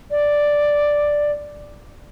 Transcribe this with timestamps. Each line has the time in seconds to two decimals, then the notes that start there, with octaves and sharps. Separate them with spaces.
0.11 D5